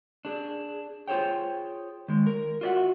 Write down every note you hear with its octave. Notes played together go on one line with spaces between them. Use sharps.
D4 G#4
F4 G#4 C5 C#5 G5
D#3 G#3
A#4
F4 F#4 D5 E5 F#5